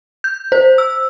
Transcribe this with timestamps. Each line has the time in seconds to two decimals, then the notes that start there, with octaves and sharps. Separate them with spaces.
0.24 G6
0.52 C5
0.78 E6